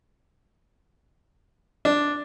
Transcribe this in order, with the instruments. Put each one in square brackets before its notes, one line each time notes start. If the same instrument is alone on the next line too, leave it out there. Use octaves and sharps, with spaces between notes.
[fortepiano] D4